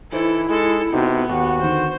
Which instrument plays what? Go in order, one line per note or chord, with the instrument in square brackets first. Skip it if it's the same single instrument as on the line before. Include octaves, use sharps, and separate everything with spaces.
[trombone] E3 [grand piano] D#4 C5 [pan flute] E4 [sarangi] A4
[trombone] G#3 [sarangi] A4
[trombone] C3 [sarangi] B3 [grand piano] D#4 F#4
[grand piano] D#2 G4 [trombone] F#4
[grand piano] D3 D#3 [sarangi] C5